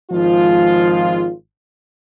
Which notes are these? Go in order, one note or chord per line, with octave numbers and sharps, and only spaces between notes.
G#1 F3 G#3 F4